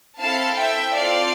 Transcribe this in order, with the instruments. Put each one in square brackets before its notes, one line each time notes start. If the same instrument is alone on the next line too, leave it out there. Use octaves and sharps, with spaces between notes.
[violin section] C4 E4 A4 F5 A5
E5 G5
C4 F4 A4 D5 F5